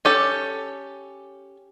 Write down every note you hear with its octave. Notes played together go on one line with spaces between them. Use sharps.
C#4 G4 A4